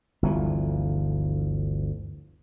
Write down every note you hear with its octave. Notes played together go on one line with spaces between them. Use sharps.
G1 D2 E3 F3